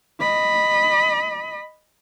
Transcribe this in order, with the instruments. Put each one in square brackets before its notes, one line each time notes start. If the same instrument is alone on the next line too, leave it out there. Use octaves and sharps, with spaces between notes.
[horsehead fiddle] D#5 B5